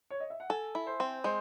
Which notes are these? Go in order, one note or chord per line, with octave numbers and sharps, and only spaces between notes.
C#5
D#5
E5
F#5
A4 G#5
E4
C5
C4
G#3 C5